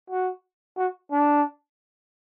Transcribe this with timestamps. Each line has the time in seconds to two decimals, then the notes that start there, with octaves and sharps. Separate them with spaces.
0.10 F#4
0.77 F#4
1.11 D4